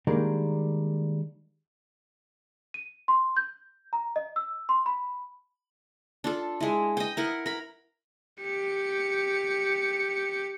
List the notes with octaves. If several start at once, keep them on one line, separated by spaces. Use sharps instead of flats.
D#3 G3 G#3 A#3 D4
D#7
C6
G6
A#5
D#5
E6
C6
B5
D4 F4 A4
G#3 E4
D#5 G5
E4 A#4 F#5
A#4 B5
G4 C#7